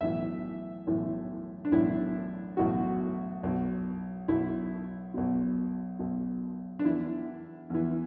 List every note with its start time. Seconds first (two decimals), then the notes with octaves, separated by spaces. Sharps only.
0.01 B1 A2 E3 E5
0.87 B1 A2 E3
1.65 D4
1.72 B1 A2 E3 E4
2.57 B1 A2 E3 F#4
3.43 B1 B2
4.28 B1 B2 E4
5.14 B1 B2
5.99 B1 B2
6.79 D4
6.84 E2 E3 E4
7.70 E2 E3